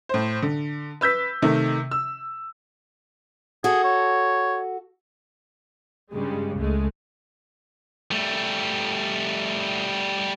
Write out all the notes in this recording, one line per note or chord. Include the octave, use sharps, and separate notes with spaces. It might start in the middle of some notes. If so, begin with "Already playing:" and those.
A2 C5
D3
B4 E6 G6 B6
C3 D#3 A3
E6
F#4 G#4 A4
C#5
G2 C#3 G3 G#3
C#2 G#3 A3
G3 A3